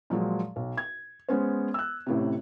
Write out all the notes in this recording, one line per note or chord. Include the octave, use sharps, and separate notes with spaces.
A#2 F3 F#3 G#3
B1
G#6
G#3 B3 C#4 C5
E6 F#6
A1 A2 C3